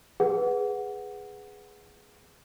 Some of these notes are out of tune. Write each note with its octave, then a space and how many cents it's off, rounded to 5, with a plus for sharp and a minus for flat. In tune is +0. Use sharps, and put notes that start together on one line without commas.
G#4 +0 B4 +0 F#5 +0